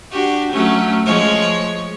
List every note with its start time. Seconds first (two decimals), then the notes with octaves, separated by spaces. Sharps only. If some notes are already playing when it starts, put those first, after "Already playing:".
0.12 D4 F#4 G4
0.52 F#3 A3 C#4
1.05 F3 G#3 C#5